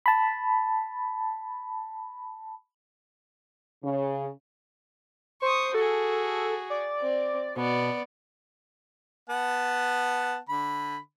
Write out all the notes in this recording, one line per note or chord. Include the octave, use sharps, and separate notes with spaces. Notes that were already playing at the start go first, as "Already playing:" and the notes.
A5 B5
C#3
C5 C#6 D#6
F#4 G#4 A4
D5
C4
B2 B3 D5
B3 F#5 A5
D3 B5